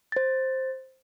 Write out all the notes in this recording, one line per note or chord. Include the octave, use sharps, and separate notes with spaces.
C5 A6